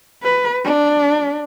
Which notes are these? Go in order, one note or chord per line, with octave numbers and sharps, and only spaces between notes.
B4
D4